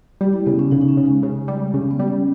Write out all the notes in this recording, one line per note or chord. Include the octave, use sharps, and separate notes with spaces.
G3 G4
E4
C#3 B3
C#4
C#3 D#4
D#4
C#4
C#3
G#3
C#3
G3
C#3
B3
G3
C#4